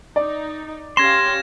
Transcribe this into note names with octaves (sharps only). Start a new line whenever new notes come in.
D#4 D5
C#4 G4 F5 C6 G#6 A#6 E7